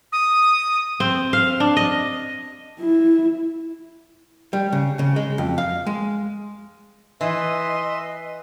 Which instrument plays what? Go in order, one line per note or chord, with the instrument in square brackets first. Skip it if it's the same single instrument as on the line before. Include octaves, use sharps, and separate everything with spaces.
[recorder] D#6
[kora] C4
F5
D4
D#5
[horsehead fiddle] E4
[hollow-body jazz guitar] G3
C#3
C#3
G#3
F2
F5
G#3
[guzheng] E3 [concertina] B4 E5 C6 [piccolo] D#5